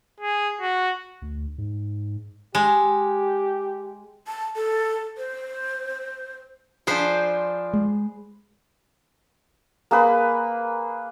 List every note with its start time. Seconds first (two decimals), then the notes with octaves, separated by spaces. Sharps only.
0.20 G#4
0.60 F#4
1.22 D2
1.58 G#2
2.55 G#3 G4
4.28 A5
4.56 A4
5.18 C5
6.87 F3 D4 G#4 B4 C5
7.73 G#3
9.91 A#3 G#4 B4